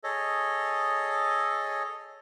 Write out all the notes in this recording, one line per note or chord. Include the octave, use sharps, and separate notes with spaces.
G#4 A4 C#5 D#5